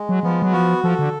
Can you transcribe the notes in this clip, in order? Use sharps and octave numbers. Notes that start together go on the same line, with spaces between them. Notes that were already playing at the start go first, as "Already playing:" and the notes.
Already playing: G#3
F#3
F3 B3
F#3
F3 F#4
F3 A4
D3